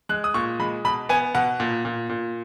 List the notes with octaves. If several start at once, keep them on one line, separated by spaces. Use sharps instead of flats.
G#3 F#6
D#6
A#2 C#6
G#3 B5
B2 B5
B3 G#5
B2 F#5
A#2
A#2
A#2